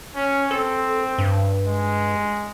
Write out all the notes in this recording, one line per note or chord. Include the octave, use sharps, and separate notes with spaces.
C#4
C4 A4
G2
G#3